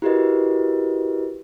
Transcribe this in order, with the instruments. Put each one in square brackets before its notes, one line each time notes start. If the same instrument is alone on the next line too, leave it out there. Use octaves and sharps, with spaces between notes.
[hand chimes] E4 F#4 G4 A#4 B4 D#5